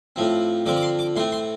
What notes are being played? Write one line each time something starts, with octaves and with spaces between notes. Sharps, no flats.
A2 F3 C4
D3 F3 C4 D6
D6
C6
D6
A2 A3 C4 C6
C6